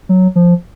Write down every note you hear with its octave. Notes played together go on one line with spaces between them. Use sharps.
F#3
F3